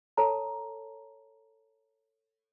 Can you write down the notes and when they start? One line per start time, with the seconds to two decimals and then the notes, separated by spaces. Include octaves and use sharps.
0.17 A4 C#5 A5 A#5